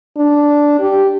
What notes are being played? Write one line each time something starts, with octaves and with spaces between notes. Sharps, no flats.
D4
G4